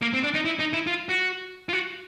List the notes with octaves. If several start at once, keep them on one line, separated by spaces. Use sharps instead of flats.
A#3
C4
D4
D#4
E4
D#4
E4
F4
F#4
F4
F#4